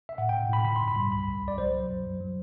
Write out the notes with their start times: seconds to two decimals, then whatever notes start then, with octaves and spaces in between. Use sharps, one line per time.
0.09 E5
0.18 A2 F#5
0.29 A2 G5
0.49 A2 B5
0.65 D3 B5
0.76 C6
0.81 G2
0.88 B5
0.96 G3
1.12 C2 B5
1.27 C2
1.43 C2 D5
1.58 F#3 C5
1.75 F#3
1.90 F#2
2.05 F#3
2.20 F#3